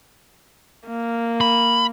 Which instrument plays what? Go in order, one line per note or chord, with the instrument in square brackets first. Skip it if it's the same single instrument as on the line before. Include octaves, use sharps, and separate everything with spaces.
[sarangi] A#3
[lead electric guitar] B5